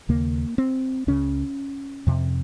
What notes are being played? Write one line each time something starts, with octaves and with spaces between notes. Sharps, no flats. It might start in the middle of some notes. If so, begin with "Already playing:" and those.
D#2 C#3 A#3
C4
C#2 C#3 C#4
F2 C3